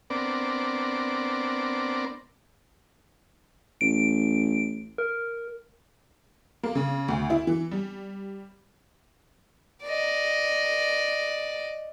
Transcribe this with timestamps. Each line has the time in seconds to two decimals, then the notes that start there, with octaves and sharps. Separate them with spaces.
0.10 B3 C4 D4 A#4 D5
3.81 A1 D7
4.98 A#4
6.63 A#3
6.75 C#3
7.08 D2
7.30 E4
7.47 E3
7.71 G3
9.83 D5 D#5